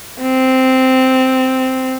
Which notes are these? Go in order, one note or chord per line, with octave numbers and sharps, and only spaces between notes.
C4